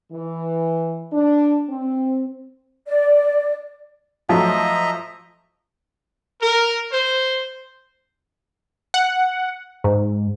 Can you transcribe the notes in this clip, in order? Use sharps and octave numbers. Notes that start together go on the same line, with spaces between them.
E3
D4
C4
D5
F3 F#3 A3 D#5 E5 A#5
A#4
C5
F#5
G#2